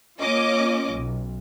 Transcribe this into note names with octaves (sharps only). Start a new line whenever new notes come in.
A#3 C#4 F4 C#5 D#5 D6
B1